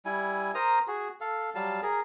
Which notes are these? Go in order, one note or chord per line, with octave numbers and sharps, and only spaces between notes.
G3 E4 G#5
A#4 C5 A#5 D#6
F#4 G#4
A4 F5
F#3 G3 F5 A5
G#4 A#4